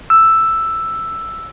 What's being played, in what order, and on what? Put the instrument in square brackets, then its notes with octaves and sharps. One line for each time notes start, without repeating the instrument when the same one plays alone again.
[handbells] E6